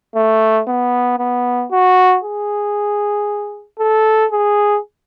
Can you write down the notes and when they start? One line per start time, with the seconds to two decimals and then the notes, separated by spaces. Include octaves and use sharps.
0.15 A3
0.67 B3
1.19 B3
1.71 F#4
2.24 G#4
3.79 A4
4.31 G#4